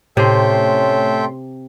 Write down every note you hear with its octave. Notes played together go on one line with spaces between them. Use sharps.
A2 C3 C#4 A4 E5 G5 C6